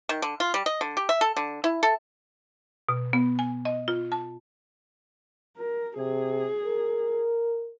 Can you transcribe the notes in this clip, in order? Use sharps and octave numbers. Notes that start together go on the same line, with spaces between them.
D#3
D3
F4
G3
D#5
D3
G4
E5
A4
D3
E4
A4
B2
B3
G#5
D#5
F4
A5
A#4
C3 G#4
A#4